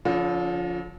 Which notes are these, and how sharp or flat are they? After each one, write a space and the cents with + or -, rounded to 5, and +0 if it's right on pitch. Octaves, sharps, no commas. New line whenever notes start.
D3 -45 F3 +0 C#4 +0